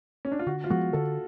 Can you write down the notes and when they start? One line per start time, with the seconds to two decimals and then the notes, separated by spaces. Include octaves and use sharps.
0.25 C#4
0.32 D4
0.39 F4
0.46 D3 F#4
0.64 F4
0.70 F3 G#3 B3 F#4
0.93 D3 A4